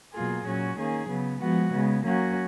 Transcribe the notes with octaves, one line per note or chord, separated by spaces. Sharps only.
B2 F#3 A#3 F4 G#4
A#2 F#3 C#4 F#4
D#3 A#3 C#4 G#4
C#3 F#3 B3
F3 G#3 B3 F#4
C#3 G#3 B3
F#3 A#3 C#4 F#4